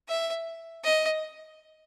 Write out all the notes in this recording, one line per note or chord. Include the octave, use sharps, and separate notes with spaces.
E5
D#5